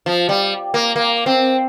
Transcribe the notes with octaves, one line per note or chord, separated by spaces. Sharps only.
F3
G3
A#3
A#3
C4